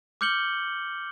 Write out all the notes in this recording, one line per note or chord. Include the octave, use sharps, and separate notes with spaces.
D6 F6 G6 C#7 F#7 G7